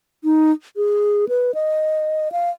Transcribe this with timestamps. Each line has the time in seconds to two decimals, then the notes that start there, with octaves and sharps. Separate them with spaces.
0.24 D#4
0.77 G#4
1.29 B4
1.54 D#5
2.32 F5